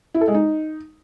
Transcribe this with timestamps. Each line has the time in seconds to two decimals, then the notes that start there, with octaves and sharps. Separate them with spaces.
0.14 E4
0.21 A4
0.28 G#3
0.34 D#4